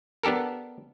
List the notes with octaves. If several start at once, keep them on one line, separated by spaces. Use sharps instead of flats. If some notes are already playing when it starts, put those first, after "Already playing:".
B3 D4 G4 A4 A#4